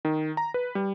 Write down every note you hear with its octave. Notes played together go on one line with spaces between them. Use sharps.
D#3
A#5
B4
G3